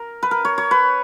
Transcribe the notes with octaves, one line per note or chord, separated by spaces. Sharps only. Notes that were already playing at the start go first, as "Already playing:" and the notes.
Already playing: A#4
B4
A#4
C#5
C#5
B4